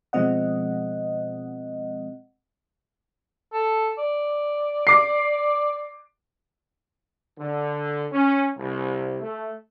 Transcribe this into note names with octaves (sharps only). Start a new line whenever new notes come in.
B2 F3 G#3 C4 D#5 F#5
A4
D5
D6 C7
D3
C#4
C2
A3